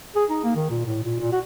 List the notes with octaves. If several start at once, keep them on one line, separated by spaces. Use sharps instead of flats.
G#4
D#4
A#3
D#3
A#2
A2
A#2
A#2
F#4